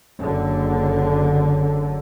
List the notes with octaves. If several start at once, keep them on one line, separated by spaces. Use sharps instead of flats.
F#1 D3